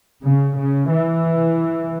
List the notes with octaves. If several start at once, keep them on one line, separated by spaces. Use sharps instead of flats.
C#3
C#3
E3